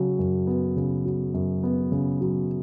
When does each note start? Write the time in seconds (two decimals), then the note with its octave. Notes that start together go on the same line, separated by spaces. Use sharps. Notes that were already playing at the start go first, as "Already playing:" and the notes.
Already playing: C#3 F#3
0.19 F#2
0.47 B3
0.77 C#3
1.05 F#3
1.34 F#2
1.63 B3
1.92 C#3
2.21 F#3